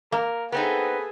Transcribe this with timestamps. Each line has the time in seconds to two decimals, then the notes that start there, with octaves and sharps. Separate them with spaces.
0.12 A#3 A#4
0.52 B3 C4 D#4 G#4 A4 B4